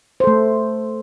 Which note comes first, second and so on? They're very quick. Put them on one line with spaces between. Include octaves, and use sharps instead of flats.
C5 A4 A3